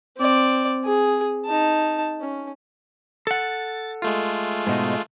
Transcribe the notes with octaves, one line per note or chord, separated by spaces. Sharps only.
C4 D5
G#4
D#4 A5
C#4
A4 F#5 A6
G#3 A3 F4
G#2 B2 D#4